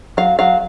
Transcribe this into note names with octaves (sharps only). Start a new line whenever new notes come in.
F#3 F5
F#3 F5